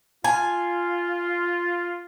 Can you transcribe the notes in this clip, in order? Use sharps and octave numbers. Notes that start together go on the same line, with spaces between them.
F4 G#5